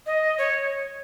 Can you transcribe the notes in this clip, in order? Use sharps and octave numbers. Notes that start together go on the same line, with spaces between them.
D#5
C#5